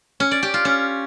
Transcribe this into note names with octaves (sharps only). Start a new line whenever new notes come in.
C#4
D5
G4
F4
C#4